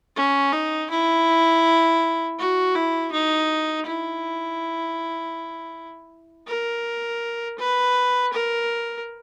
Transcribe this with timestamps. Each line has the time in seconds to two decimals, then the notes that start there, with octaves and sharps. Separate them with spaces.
0.16 C#4
0.53 D#4
0.91 E4
2.39 F#4
2.75 E4
3.12 D#4
3.86 E4
6.47 A#4
7.59 B4
8.32 A#4